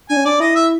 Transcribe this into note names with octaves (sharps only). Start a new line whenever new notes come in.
D4 G#5
C#4
D4 D5
E4 D#5
E5